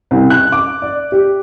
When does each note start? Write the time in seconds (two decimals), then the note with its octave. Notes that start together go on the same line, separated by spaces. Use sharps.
0.11 C2
0.30 F#6
0.52 D6
0.82 D5
1.12 G4